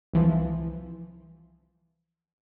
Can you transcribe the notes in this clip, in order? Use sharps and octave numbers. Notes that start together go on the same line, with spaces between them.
C2 E3 F3